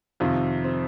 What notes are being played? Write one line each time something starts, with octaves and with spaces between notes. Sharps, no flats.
F2 C3 D#3 F4
C4